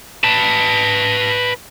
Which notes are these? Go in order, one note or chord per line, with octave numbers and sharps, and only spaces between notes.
B4 A5